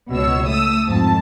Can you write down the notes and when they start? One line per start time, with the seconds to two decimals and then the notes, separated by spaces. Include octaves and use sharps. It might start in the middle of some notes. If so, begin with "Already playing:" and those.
0.11 C#2 B2 C#5 E6
0.45 A3 D#6 E6
0.87 G#1 F2 G#2 A5